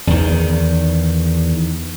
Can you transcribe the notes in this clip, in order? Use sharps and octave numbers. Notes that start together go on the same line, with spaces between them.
E2 D#3